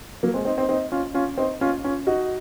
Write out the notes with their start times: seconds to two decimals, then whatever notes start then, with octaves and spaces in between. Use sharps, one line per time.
0.23 F#3 A#3
0.34 G#3 C4
0.45 C4 D#4
0.58 C4 D#4
0.69 C4 D#4
0.92 C#4 F4
1.14 C#4 F4
1.37 C4 D#4
1.61 C#4 F4
1.84 C#4 F4
2.07 D#4 F#4